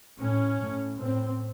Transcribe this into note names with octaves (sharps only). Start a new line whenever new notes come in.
A2 C#4
A2
A2 C4